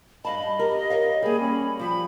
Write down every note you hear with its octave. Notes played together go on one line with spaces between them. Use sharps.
G2 D#5 F5 A5 B5
G4 A#4
A#4 C#5 F5
G3 A#3 G#4 B5
C#4
F3 G3 B5